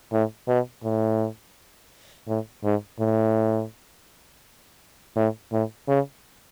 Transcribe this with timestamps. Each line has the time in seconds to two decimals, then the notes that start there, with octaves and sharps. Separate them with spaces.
0.13 A2
0.48 B2
0.83 A2
2.27 A2
2.64 G#2
2.99 A2
5.16 A2
5.52 A2
5.88 C#3